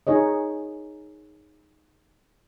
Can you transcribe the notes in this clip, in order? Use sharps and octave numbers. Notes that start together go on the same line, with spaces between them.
D#4 G#4 C#5 D#5